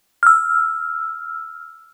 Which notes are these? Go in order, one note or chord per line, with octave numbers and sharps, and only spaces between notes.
E6 F6